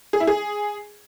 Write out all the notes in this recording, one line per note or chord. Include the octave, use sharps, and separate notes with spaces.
G#4
E4
G#4